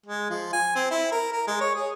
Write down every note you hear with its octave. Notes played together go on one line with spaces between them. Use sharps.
G#3
F3
G#5
C4
E4
A#4
A#4
G#3
C#5
G#4